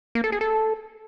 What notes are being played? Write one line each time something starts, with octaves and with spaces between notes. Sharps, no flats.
A#3
A4
G#4
A4